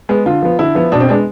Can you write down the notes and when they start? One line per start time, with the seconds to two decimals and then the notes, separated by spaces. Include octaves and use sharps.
0.09 G#3 B3
0.26 D3 F4
0.42 F3 B3
0.59 D3 E4
0.75 F3 B3
0.92 B2 D4
1.00 C4
1.09 G#3 B3 D4